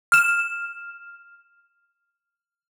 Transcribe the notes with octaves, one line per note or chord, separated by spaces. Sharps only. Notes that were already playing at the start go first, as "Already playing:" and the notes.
F6 E7